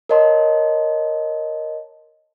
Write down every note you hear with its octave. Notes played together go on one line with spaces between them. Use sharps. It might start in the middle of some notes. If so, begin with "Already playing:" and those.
A#4 C#5 D#5 A5 C6